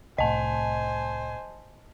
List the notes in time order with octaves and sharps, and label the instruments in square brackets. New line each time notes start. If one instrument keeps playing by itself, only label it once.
[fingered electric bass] C2 A2 [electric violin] C5 G#5 [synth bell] D#5 A5